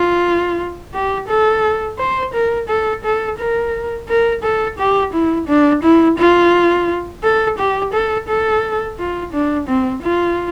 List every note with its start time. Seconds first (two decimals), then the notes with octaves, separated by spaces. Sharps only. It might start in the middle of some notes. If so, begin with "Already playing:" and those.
Already playing: F4
0.94 G4
1.29 A4
1.99 C5
2.34 A#4
2.69 A4
3.04 A4
3.38 A#4
4.08 A#4
4.43 A4
4.78 G4
5.13 E4
5.48 D4
5.83 E4
6.18 F4
7.24 A4
7.58 G4
7.93 A4
8.28 A4
8.98 F4
9.33 D4
9.68 C4
10.03 F4